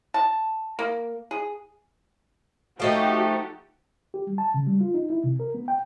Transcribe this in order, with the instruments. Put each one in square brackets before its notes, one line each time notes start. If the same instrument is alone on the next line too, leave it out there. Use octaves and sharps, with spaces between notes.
[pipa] A5
A#3
G#4
[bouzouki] F3 A3 D#4 [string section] F#4 G4 A4
[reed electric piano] G4
G3
A5
C#3
G3
F4
D#4
E4
C3
A#4
B3
G5